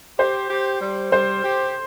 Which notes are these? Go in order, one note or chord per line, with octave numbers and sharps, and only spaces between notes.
G4 C5
G4
G3
G3 C5
G4